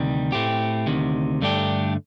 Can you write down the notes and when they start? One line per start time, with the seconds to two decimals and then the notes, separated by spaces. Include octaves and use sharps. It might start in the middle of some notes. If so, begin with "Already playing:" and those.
Already playing: D2 C3 D#3 G3
0.32 A2 A3 C4 G4
0.87 D2 C3 D#3
1.41 G2 D3 A3 D4 G4